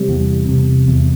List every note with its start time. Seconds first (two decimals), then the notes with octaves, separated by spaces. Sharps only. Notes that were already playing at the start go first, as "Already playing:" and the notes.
Already playing: C3 G3
0.08 E2
0.48 C3
0.88 E2